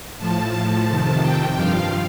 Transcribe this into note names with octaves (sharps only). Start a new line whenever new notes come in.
A2 F3 A5
A2 F3
F2 C3 D#3
F2 C3 D#3 G5
G2 F3 F5